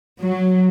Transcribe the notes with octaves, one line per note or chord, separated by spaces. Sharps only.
F#3